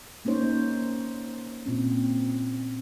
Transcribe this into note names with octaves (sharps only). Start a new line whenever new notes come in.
A#3 C#4 D#4 C5 C#5
A#2 C4 C#4